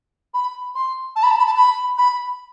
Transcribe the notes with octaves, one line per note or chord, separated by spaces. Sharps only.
B5
C6
A5
B5
A5
B5
A5
B5
B5